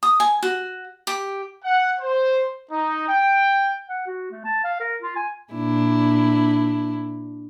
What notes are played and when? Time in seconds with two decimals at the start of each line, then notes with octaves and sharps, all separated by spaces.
0.03 D#6
0.20 G#5
0.43 F#4
1.07 G4
1.64 F#5
2.00 C5
2.72 D#4
3.08 G5
3.89 F#5
4.07 F#4
4.31 A3
4.44 A5
4.64 F5
4.80 A#4
5.02 F4
5.16 G#5
5.53 A#2 D4 E4